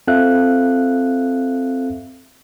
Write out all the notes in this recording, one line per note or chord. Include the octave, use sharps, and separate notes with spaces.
C4 F4 A4 E5 F5 F#6